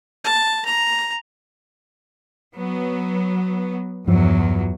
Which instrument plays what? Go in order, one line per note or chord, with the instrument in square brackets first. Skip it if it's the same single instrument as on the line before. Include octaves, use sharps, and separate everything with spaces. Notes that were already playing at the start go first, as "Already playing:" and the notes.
[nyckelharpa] A5
A#5
[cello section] F#3 B3
[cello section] E2 F#3 [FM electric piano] G2 F3